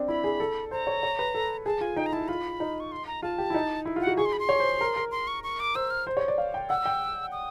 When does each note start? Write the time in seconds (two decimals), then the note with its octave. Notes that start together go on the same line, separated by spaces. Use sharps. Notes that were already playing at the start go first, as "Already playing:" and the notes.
Already playing: C4 D4
0.08 E4 B5
0.24 G#4
0.40 A4
0.71 C5 A#5
0.87 C#5
1.03 C#5
1.19 B4
1.34 A4
1.66 G#4 A5
1.81 F4 G#5
1.96 D#4 G5
2.06 A#5
2.13 E4 A5
2.28 F4 B5
2.60 D#4
2.80 C#6
2.92 C6
3.07 A#5
3.22 F4 A5
3.38 G4
3.50 E4
3.54 D#4
3.85 E4
3.96 F4
4.01 F#5
4.07 F#4
4.17 G#4 C#6
4.25 C6
4.33 B5
4.39 C6
4.49 C#5
4.60 C5
4.81 A#4
4.96 A#4
5.11 C6
5.27 C#6
5.43 C#6
5.60 D6
5.75 C5 E6
5.90 F6
6.07 C5
6.17 C#5
6.28 D5
6.38 F5
6.54 G5
6.69 F#5 E6
6.86 G5
7.32 D#6